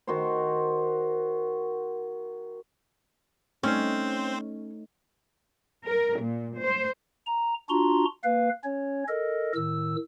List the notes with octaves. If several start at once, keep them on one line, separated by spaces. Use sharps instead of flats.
D#3 F#4 C5
A3 C4 C#4 D#4 C5
A#4
A#2
C5
A#5
D4 F4 F#4 A#5 C6
A#3 B4 F5
C#4 C#5
A4 A#4 D#5
A2 D#3 E6